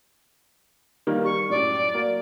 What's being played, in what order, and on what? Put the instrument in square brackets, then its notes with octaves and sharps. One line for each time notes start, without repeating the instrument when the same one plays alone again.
[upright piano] D#3 G3 A#3
[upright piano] G3 [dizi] C#6
[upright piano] F#2 A2 [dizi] D5
[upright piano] F#3 A#3